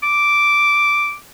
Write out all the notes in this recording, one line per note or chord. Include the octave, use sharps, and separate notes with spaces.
D6